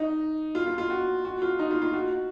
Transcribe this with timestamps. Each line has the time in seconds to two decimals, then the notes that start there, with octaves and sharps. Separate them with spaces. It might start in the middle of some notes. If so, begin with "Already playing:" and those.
Already playing: D#4
0.55 F4
0.66 F4
0.78 F4
0.90 F#4
1.25 F#4
1.42 F4
1.59 D#4
1.71 F4
1.82 F4
1.93 F#4